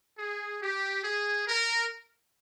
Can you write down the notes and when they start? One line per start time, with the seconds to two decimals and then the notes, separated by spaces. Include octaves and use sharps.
0.18 G#4
0.62 G4
1.04 G#4
1.48 A#4